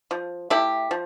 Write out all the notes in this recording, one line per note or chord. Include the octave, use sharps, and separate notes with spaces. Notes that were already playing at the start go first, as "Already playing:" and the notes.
F3
A3 E4 G4
F3